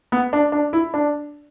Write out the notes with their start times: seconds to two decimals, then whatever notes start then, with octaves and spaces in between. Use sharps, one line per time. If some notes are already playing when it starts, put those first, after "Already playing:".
0.12 B3
0.33 D4
0.52 D4
0.73 E4
0.94 D4